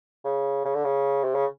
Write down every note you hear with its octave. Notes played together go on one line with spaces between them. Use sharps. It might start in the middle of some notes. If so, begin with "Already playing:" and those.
C#3
C#3
D3
C#3
C3
C#3